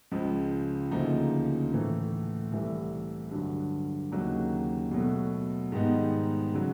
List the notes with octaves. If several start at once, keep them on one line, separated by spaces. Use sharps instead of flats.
C#2 C#3 F3
D2 C#3 F3 A#3 D#4
A2 E3 A3
C2 C3 E3 A3
G2 D3 F#3
D#2 C#3 F#3 A#3 D#4
B2 F#3 A3
G#2 D#3 G3 B3 D#4
C#3 F#3